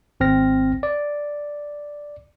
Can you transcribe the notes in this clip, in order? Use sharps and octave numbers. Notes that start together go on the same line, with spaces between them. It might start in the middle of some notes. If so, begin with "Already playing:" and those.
G#1 C4 F6 A#6
D5